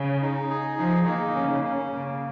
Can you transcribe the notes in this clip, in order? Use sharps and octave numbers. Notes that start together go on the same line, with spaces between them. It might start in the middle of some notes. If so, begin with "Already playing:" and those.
Already playing: C#3
D#4
G#4
F3 D#4
D#3 A#3
C#3 C#4
C#4
C#3 A#3